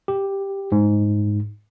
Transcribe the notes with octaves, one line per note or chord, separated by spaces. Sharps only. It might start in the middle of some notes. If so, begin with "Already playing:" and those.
G4
G#2